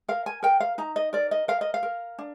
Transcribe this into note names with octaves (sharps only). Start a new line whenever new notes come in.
A#4 F5
G#5
A#4 G5
F5
D#4 A#5
D#5
A#4 D5
D#5
A#4 F5
D#5
F5
A#4
D4